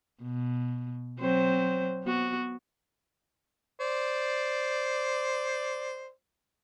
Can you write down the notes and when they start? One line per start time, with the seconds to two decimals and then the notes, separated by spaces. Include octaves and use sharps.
0.23 B2
1.20 F#3 C4 C5
2.04 B3 F#4
3.80 C5 D5